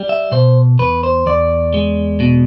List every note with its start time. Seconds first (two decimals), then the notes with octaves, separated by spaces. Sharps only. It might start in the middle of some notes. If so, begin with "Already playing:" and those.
Already playing: G3
0.09 E5
0.32 B2 C5
0.79 E2 B4
1.03 C5
1.26 E2 D5
1.74 G#3
2.20 B2